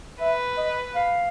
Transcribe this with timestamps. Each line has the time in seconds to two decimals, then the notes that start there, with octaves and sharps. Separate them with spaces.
0.21 B4 E5
0.58 D#5
0.96 F5